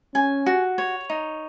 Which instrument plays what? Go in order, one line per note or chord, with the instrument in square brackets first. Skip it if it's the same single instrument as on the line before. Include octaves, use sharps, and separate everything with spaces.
[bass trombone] C#4 [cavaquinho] G#5
[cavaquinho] F#4
C#5
D#4